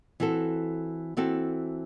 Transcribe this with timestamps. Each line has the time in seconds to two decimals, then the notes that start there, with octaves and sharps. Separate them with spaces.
0.20 E3 C4 F#4 A4
1.17 E3 C4 F#4 A4